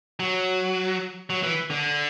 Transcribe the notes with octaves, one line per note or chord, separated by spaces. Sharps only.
F#3
F#3
E3
D3